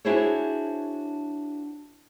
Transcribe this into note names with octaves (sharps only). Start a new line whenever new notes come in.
D4 E4 F#4 G#4 C5 C#5